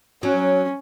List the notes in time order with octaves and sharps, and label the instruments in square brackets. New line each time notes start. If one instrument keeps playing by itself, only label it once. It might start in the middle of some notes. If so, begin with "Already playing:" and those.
[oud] F#3 [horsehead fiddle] C#4